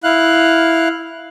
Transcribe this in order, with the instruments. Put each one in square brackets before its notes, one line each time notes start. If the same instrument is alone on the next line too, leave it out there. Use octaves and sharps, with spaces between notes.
[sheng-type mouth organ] E4 F5 F#6